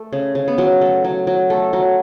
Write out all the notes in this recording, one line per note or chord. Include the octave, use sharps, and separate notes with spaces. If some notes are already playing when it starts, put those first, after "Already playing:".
Already playing: A3
C#3
C#3
B3
F#3 C#4
A3
F#3
F#3
A3
F#3